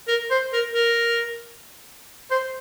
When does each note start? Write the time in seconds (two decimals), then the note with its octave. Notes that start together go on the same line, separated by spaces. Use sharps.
0.08 A#4
0.31 C5
0.53 A#4
0.75 A#4
2.31 C5